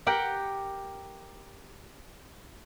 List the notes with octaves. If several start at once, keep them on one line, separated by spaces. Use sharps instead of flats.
G4 A#4 F#5 G5